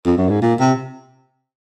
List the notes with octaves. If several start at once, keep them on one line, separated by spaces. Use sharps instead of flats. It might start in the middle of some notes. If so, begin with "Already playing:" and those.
F2
F#2
G#2
A#2
C3